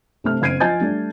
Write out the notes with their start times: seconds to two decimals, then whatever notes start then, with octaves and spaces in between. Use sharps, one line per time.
0.24 C3 A3 F6
0.42 F#1 C4 G#6 C7 D7 D#7
0.60 F3 F4 D#5 G#5 G6 A6
0.80 G3 A3 D4